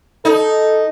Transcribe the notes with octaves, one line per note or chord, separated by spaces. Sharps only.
D#4 A4